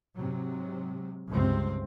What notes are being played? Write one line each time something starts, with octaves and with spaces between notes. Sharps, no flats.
G#2 C3 F#3
C#2 G2 C3 C4